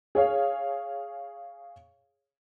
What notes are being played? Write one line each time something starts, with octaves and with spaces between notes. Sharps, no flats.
G#4 C#5 F5